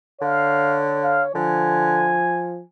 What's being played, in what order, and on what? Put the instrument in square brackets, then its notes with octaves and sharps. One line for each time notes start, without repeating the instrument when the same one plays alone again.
[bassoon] D3 [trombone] C#5 [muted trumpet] F5
[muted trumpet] F5
[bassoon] D3 [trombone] F3 [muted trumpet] G#5